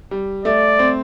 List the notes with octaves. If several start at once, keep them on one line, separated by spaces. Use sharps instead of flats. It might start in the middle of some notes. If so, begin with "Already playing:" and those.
G3
A3 D5
C4